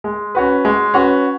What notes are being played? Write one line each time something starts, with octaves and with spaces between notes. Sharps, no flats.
G#3
C#4 F#4 B4
G#3
C#4 F#4 B4